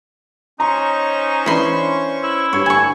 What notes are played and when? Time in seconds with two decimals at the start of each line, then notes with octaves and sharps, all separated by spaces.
0.60 C#4 D#4 C5 A#5 C#6
1.46 E3 D4 B5 C6
2.23 E4
2.53 G2 C#5 C6
2.66 A2 D3 G#5 C#6